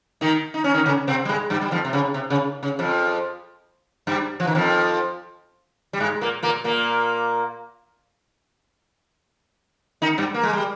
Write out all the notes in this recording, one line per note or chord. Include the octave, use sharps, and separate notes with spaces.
D#3 D#4
D#4
C#4
D#3 D#4
C#3 C#4
C3 C4
G3
G#2 G#3
G2 G3
G3
F2 F3
C3
C#3
C3
C#3
C#3
F2 F3
G2 G3
F3
D#3
F2 F3
G3
G#2 G#3
A#2 A#3
A#2 A#3
A#2 A#3
D#3 D#4
G2 G3
A#3
G#3
G3